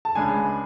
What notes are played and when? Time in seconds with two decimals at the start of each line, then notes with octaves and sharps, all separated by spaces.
0.05 A5
0.15 C#2 C#3 G#3 D4 G#5